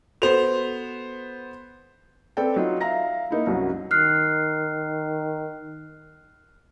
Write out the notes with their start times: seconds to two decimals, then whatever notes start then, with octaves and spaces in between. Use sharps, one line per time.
0.22 B3 F#4 A4 C5 F7
2.37 C4 A4 B4 D5 G5
2.56 F#3 D#4 F4
2.81 E5 F5 A#5 A#6
3.31 A#3 D#4 E4
3.47 C2 F#2 F#3
3.91 D#3 F6 F#6 C7